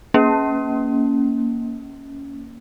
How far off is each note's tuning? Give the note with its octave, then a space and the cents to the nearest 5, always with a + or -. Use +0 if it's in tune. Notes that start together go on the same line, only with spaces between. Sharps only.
A#3 +0 C#4 +5